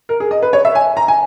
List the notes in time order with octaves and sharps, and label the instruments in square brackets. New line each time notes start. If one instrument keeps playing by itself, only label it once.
[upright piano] A#4
G#4
D#5
B4
C#5
E5
G#5
A#5
G#5